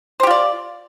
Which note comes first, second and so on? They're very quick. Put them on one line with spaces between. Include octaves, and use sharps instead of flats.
C5 G4 F4 D5